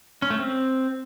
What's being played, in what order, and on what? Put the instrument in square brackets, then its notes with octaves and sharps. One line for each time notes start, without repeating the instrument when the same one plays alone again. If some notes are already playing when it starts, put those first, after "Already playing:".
[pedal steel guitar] C#4
A3
C4